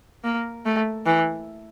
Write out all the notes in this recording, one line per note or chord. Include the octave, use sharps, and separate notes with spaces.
A#3
A3
E3